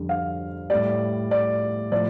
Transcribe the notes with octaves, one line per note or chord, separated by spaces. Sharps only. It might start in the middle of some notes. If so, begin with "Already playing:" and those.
Already playing: F2 D3 G3
F5
A2 G3 D5
D5
A2 F3 D5